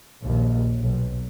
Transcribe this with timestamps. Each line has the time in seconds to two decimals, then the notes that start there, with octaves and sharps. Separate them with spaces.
0.23 A#1 D#2
0.80 B1